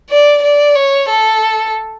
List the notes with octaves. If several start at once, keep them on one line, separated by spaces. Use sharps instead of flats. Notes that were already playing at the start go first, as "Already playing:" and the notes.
D5
D5
C#5
A4